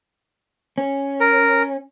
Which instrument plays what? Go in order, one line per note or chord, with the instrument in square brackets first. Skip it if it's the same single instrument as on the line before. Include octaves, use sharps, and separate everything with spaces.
[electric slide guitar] C#4
[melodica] A#4